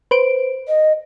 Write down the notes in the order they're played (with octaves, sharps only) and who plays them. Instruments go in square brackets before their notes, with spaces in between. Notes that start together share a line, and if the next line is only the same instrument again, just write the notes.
[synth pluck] B4 C5 D7
[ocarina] D#5